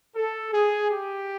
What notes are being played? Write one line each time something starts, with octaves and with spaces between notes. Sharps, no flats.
A4
G#4
G4